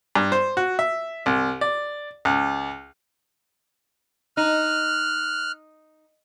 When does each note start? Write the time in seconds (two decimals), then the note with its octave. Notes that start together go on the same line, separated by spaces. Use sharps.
0.15 G2
0.32 C5
0.57 F#4
0.79 E5
1.26 C2
1.61 D5
2.25 C#2
4.37 D#4 F6 F#6